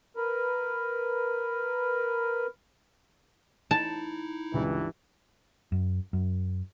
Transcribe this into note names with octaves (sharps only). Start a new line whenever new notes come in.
A#4 B4
D#4 E4 A5
C#2 G2 E3
F#2
F#2